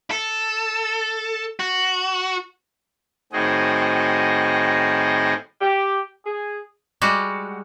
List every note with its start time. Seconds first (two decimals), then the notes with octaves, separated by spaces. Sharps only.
0.11 A4
1.60 F#4
3.33 A2 D#3 C4 F#4 G#4 D#5
5.61 G4
6.26 G#4
7.01 G3 G#3 F#4